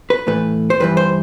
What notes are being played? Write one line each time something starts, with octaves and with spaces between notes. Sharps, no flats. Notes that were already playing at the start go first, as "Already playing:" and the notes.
B4
A2 E3 A3 B4
C5
G2 E3 G3 B4
C5